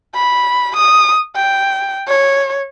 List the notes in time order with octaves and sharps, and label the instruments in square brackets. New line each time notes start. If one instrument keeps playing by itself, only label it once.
[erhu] B5
D#6
G5
C#5